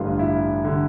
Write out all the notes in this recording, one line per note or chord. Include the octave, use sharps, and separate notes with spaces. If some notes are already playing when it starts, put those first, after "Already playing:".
Already playing: A1 G2 D3 F4
E4
D3